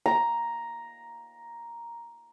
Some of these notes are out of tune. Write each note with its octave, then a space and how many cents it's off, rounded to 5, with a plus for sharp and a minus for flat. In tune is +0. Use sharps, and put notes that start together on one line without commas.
A#5 +5